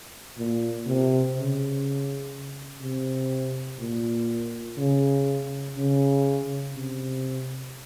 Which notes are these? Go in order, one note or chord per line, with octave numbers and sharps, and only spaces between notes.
A#2
C3
C#3
C3
A#2
C#3
C#3
C3